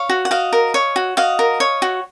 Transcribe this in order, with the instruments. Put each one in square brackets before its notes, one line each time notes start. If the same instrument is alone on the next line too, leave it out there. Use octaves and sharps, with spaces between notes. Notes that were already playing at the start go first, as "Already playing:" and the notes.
Already playing: [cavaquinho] C#5 F5
F#4
F#5
F#4 D#5 F5
A#4
C#5
F#4
F#4 D#5 F5
A#4
C#5
F#4